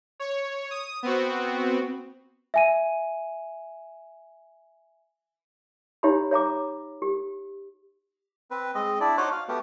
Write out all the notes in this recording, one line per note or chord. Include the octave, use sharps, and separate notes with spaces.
C#5
D#6
B3 C4 F#4
E5 G#5 D#7
D#4 G4 C#5 E5 A#5 B5
C#5 E5 A#5 D6
G4
C4 B4
G#3 C4 D#5
D4 E4 D5
D#4 F#4 C5 C#5 D6 F#6
F5
A3 B3 F#4 G4